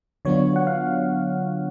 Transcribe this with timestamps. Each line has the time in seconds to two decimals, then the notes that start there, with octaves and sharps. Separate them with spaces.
0.25 D3 F#3 B3 D4 F4 C#5
0.56 F#5
0.67 F5